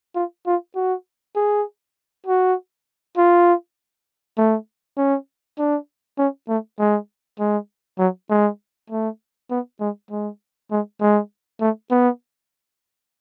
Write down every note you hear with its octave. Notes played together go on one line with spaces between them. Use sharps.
F4
F4
F#4
G#4
F#4
F4
A3
C#4
D4
C#4
A3
G#3
G#3
F#3
G#3
A3
B3
G#3
G#3
G#3
G#3
A3
B3